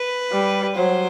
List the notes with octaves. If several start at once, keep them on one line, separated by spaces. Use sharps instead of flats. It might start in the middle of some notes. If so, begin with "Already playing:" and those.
Already playing: B4
G3
F#3 C5